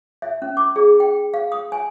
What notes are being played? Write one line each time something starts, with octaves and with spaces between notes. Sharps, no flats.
E5
C#4
D6
G#4
G5
F5
D#6
G#5